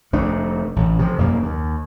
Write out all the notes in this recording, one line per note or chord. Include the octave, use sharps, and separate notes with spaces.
F1 A3 D4
A1
C3 F3
F1 F#2 A#3
D#2